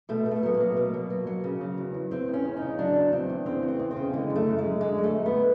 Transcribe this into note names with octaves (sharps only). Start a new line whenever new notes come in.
B2 A3
B2
A3
F#3 B3
A#3
F#3
B2
B2
F#3
F#3
C#3
F#3
E2
E2
E2 C4
E2
C#4
C#3
D#4
C#3
F#3 D4
E2
E2 C4
E2
C#3 C4
E2
C4
E2
C4
C#3
D3 G#3
F#2
A3
F#2
G#3
F#2
D3 G#3
F#2
A3
F#2
B3